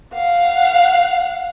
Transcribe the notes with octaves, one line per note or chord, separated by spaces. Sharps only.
F5 F#5